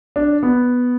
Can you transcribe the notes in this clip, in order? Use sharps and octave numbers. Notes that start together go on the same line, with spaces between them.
D4
B3